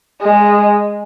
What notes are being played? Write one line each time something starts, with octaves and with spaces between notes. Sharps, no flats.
G#3